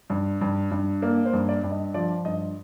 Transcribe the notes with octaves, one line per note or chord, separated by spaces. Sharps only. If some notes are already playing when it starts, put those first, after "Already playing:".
G2
G2
G2
A#3 D5
C5
G2
D5
G2
D#5
F3 D5
G2 D#5